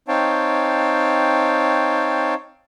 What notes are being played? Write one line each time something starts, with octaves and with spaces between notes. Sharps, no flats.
C4 D#4 C#5 F5 G5 A5